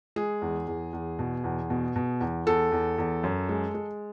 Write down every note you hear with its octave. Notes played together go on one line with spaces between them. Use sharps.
G#3 G#4
E2
E2
E2
B2
E2
B2
B2
E2
E2 A4
E2
E2
F#2
G#3
G#3